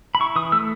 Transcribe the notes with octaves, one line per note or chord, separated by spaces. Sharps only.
B5
E4 C#6
E3 D#6
A3 E6